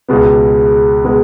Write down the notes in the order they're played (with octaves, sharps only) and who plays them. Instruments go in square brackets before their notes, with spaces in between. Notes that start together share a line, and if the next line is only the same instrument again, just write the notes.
[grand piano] C#2 B2 G#3 B3
B2 G#3 B3